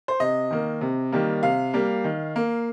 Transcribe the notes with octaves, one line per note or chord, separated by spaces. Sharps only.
C5
C3 D#5
D#3 A#3
C3
D#3 G3 A#3
C3 F5
G3 A#3
D#3
A#3